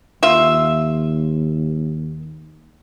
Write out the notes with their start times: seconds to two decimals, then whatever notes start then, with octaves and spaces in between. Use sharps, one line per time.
0.23 D#2 F4 E5